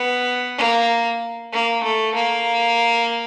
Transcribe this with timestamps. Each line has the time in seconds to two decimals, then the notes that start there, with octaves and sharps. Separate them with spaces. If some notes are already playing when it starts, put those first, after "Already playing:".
Already playing: B3
0.58 A#3
1.53 A#3
1.83 A3
2.14 A#3